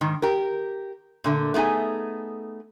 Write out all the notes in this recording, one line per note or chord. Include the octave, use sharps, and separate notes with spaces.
G#2 D#3
G4 A#4
A#2 D3 A3
A3 B3 D#4 G#4 G#5